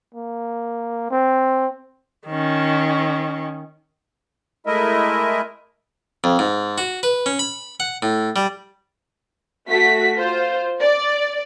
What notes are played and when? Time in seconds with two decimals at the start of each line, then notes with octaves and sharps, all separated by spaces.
0.15 A#3
1.11 C4
2.28 D#3 C#4
4.67 G#3 A3 E4 A#4 D#5 E5
6.24 F2
6.39 G#2
6.78 F#4
7.03 B4
7.26 C#4
7.39 B5
7.80 F#5
8.02 A2
8.36 G3
9.69 A3 F#4 B6
10.18 F4 C5
10.81 D5